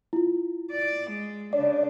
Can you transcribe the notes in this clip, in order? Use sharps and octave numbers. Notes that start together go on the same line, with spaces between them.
E4 F4
D5
G#3
C#3 D4 C#5 D5